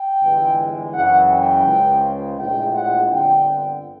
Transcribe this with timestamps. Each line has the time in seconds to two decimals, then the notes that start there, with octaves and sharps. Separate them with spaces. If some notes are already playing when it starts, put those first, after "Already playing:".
Already playing: G5
0.21 G1 G2 E3 G#3
0.93 F#2 C#3 E3 F#5
1.29 G5
1.65 C#2 C#3 F3 G#3
2.37 A#1 A2 F3 G#3 G5
2.73 F#5
3.10 G1 F2 D3 G5